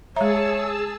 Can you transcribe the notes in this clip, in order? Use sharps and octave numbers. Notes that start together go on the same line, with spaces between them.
G#3 G#4 C#5 E5 A5 A#5 E6